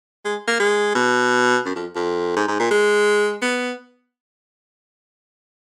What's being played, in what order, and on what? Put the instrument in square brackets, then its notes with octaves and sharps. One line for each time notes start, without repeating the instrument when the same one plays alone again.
[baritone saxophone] G#3
A#3
G#3
B2
F#2
F2
F2
G#2
G#2
A#2
G#3
B3